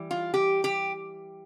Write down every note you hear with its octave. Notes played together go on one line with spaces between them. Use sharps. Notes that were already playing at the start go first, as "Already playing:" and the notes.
Already playing: E3 G3
F4
G4
G4